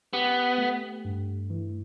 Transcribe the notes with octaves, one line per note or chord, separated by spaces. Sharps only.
B3 G4
A3
G2
E3